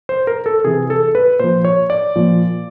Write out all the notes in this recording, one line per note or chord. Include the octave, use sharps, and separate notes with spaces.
C5
A#4
A4
C3 E3 G#4
A4
B4
A#2 F3 C5
C#5
D5
A#2 F3